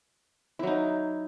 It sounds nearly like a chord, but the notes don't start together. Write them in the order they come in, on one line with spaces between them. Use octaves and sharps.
E4 F#3 D#4